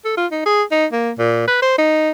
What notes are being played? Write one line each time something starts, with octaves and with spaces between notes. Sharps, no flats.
A4
F4
D#4
G#4
D#4
A#3
A#2
B4
C5
D#4